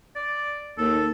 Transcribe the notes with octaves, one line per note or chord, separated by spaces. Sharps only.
D5
D#2 A4